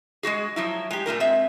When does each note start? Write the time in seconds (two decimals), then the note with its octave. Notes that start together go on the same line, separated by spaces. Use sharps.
0.23 G#3 E4 F#4 G#4
0.56 F3 F#3 E4
0.91 G#3 G4
1.06 A#2 A3 F4 A#4
1.20 G#3 C4 E5